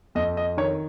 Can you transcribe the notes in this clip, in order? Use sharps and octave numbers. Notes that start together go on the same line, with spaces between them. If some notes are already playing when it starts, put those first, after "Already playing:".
F2 D#5
D#5
D#3 C#5